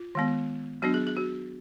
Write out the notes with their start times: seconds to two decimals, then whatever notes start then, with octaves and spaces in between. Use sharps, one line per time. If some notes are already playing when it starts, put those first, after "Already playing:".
Already playing: F4
0.15 D#3 G#3 B3
0.82 F#3 B3 D4 F#4
0.94 G#4
1.07 G#4
1.17 F#4